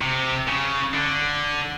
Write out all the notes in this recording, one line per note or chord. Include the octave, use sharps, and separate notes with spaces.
C3
C#3
D3